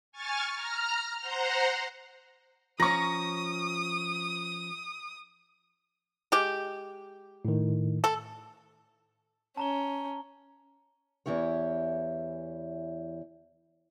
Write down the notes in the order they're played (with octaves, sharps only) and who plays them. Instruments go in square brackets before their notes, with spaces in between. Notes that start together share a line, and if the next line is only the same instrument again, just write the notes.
[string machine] G#5 C#6 F6 A6
A#5 F6
C5 F#5 A#5 C6
[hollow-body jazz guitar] F3 C#4 [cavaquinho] A#5 [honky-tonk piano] C#6 A#6 [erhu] D#6
[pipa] G#3 G4
[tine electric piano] A2 D#3
[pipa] A4
[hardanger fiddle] C#4 [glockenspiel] A5 A#5 G7
[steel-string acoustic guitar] E2 E3 E4 G4 C#5